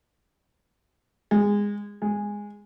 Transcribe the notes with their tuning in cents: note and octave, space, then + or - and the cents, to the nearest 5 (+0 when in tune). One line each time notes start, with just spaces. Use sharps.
G#3 -20
G#3 -10